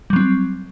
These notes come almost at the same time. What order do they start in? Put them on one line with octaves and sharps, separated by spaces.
G3 F#3 C4